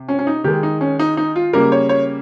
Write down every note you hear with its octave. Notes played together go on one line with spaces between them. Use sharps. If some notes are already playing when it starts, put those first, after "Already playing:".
Already playing: C3
C#4
C#4
D#4
D#3 G#3 G4
D#4
C#4
D#4
D#4
F4
C#3 G3 A#3 A#4
C#5
C#5